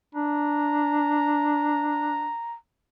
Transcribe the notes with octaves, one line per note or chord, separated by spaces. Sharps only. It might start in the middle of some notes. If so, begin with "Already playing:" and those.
D4 A#5